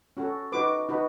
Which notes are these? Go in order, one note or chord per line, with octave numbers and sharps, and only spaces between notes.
C#4 F#4 A4
D#4 F#4 B4 D6
D#4 F#4 B4